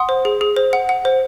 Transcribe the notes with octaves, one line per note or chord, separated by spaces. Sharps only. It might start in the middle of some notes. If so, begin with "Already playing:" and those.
Already playing: F#5 C6 D#6
C5
G#4
G#4
C5
F#5
F#5
C5